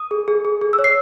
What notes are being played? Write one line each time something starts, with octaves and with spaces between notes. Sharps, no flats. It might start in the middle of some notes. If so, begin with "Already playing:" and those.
Already playing: D#6
G#4
G#4
G#4
G#4
E6
C#5
C7